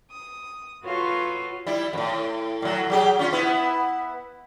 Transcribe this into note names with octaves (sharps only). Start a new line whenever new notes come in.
D#6
F4 F#4 A4 B4 C#5 F5
G3 E4
F2 A2
A2 F#3
F#3 G4 G#4
C#4 F4
B3 E4